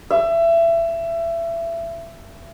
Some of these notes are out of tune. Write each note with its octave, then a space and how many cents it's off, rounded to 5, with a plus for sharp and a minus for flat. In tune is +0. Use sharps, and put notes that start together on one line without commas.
E5 +25